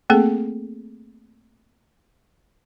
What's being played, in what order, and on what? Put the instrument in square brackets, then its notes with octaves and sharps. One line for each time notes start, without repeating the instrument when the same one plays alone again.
[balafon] A3 A#3 C4 G#4 A4